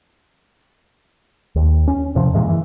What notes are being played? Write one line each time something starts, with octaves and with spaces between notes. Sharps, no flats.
D#2
C#4
E2 C3 F3
G2 A#2 E3 G#3
E3